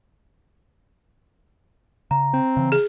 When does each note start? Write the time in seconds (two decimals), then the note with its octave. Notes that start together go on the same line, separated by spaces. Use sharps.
2.11 C#3 A#5
2.34 C4
2.57 C#3 E3
2.72 G#4